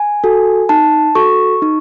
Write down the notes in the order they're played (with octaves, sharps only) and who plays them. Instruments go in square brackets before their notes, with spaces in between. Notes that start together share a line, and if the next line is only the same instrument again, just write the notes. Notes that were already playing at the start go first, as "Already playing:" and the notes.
Already playing: [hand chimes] G#5
F#4 A4
D#4 A5
F#4 A4 C#6
D#4